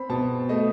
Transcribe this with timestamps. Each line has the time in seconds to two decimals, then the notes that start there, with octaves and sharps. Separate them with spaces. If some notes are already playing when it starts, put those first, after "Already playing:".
Already playing: C4 B5
0.09 B2 A5
0.49 A3 D#5